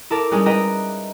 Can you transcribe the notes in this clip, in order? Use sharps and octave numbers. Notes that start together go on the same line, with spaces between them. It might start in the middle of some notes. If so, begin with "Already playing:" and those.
E4 A4 A#4 A5 D6
G3 G#3 C#4 D#4
B4 D#5 E5 G5 A#5